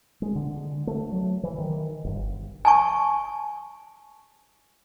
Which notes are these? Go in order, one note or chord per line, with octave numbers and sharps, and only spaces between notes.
G#3
D3
A3
F#3
E3
D#3
G1
G#5 A5 C#6